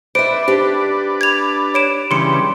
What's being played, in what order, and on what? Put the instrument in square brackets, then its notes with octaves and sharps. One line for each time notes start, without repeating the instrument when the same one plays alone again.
[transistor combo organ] B4 D5 [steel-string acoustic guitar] C5 E5 [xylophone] D7
[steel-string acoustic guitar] D4 G4
[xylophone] G#6 F7
C#5 D7 E7
[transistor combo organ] C#3 E3 G3 [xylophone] C6 C#7